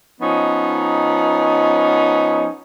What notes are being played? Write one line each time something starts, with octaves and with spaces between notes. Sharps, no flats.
F3 B3 C#4 D#4